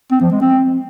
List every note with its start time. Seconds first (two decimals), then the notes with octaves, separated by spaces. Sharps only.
0.11 C4
0.21 F3
0.31 G#3
0.41 C4